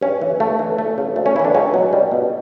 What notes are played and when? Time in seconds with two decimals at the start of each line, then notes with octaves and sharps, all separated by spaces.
0.01 G2 C#4
0.21 E3
0.40 G2 A3
0.59 E3
0.78 D2 A3
0.98 C#3 E3
1.16 D2 A3
1.26 C#4
1.36 C#3 E3 E4
1.45 D4
1.55 C#2 C#4
1.74 B2 F#3
1.93 C#2 G3
2.11 B2